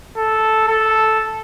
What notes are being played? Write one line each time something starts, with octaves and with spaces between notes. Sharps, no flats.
A4
A4